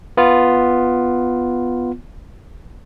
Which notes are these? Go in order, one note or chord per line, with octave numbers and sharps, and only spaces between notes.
B3 F4